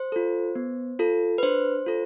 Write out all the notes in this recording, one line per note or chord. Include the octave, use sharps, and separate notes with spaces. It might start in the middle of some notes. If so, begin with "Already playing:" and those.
Already playing: C5
F4 A4
B3
F4 A4
B4
D4 C5
F4 A4